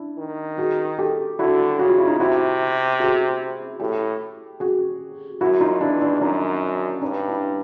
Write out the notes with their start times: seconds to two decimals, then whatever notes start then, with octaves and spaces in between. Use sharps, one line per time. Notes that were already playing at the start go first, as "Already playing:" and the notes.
Already playing: D4 E4
0.18 D#3
0.58 F#4 G#4
0.99 G4 A4
1.39 D3 E4 F#4
1.79 C#3 F#4
1.89 F4
1.98 E4
2.07 D#4 F4
2.20 C3 E4 F#4
3.00 F#4 G#4
3.80 A2 G4 A4
4.60 F#4 G#4
5.41 F#2 E4 F#4
5.60 D#4 F4
5.81 E2 D4 E4
6.01 D4 E4
6.21 F#2 C#4 D#4
7.02 G2 C#4 D#4
7.28 D4 E4